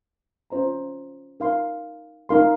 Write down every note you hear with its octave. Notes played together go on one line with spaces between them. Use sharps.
C#4 F4 C5 D#5 A#5
D#4 A#4 F5 C6
D#4 A#4 F5 C6